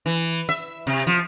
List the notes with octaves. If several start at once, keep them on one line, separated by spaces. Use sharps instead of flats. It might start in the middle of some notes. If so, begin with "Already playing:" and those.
E3
E5
C3
F3